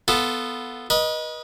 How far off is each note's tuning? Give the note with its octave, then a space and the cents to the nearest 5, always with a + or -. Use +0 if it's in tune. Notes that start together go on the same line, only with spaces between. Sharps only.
B3 +0 F4 -5 A4 +0
B4 -40 D#5 +0